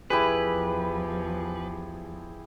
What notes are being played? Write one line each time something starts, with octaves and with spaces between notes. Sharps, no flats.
E2 F3 E4 G4 G#4 B4